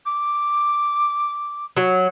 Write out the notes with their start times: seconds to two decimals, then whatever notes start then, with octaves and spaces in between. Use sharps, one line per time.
0.06 D6
1.77 F#3